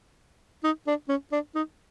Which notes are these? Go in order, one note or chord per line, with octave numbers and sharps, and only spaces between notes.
D#4
D4
C#4
D4
D#4